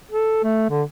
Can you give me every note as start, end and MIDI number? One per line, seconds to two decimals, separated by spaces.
0.11 0.42 69
0.44 0.68 57
0.70 0.83 50